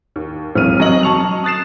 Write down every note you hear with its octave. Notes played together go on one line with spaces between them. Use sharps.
D#2
E1 B1 C3 F6 D#7
F2 F#3 C#4 D#5 F#7
F#3 A5 C#6 F7
D#6 F#6 A6 C7 E7